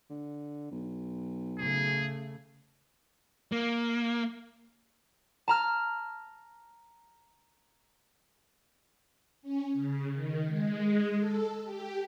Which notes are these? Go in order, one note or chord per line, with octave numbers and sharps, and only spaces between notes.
D3
B1
C#3 A3 G#4
A#3
A5 A#5 F6
C#4
C#3
D#3
G#3
A4
G4